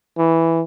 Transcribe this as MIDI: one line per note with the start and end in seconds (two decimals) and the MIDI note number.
0.18 0.62 52